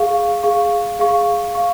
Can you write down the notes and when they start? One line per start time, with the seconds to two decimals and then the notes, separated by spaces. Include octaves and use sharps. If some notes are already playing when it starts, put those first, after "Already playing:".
Already playing: G#4 F5 C#6
0.43 G#4 F5 C#6
0.99 G#4 F5 C#6
1.55 F5 C#6